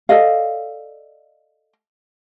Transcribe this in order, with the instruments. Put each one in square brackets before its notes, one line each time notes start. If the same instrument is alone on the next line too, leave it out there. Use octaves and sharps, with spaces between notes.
[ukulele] A4 D5 D#5 F5